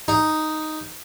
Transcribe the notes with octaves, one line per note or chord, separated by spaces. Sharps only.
D#4